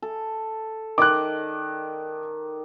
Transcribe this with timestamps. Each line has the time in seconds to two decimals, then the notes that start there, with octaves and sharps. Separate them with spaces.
0.02 A4
0.98 D#3 D5 D#5 D6 F#6